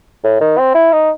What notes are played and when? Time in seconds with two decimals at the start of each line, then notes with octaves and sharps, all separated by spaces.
0.24 A2
0.41 D#3
0.58 C4
0.75 E4
0.93 D#4